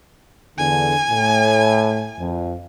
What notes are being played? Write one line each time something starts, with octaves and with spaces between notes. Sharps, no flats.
E2 D3 G#5
A2
F2